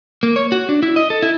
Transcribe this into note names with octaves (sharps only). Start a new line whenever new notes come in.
A#3
C#5
F#4
D4
E4
D#5
A4
E4